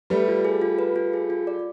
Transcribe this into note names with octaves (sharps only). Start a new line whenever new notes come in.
G3 A3 B4
F4
G#4
F4
B4
F4
G#4
F4
D5